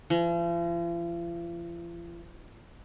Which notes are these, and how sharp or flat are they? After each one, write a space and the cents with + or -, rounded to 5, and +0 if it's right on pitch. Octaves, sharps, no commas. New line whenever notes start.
F3 -45